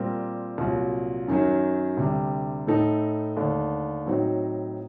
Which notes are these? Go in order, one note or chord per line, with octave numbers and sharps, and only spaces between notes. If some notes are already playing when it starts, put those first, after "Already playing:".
Already playing: A#2 G3 C4 G4 A#4
C2 A#2 F#3
F#2 D#3 F#3
D2 C3 G3
A2 A3 D#4 A4
D#2 D3 A3 D4
A2 F#3 C4 D#4 F#4